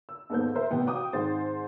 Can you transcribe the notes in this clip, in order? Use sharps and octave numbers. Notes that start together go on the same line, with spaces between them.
E6
D#2 G#2 B3 A4 C5 G6
A#4 C5 E5
A1 C3 B3 G5
F#4 F5 G5 D6 D#6
G#2 D#3 C4 C5 C6 A6